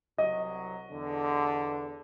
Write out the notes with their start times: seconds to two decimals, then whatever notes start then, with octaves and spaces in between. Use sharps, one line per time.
0.18 C2 F#3 D#5
0.92 E2 D3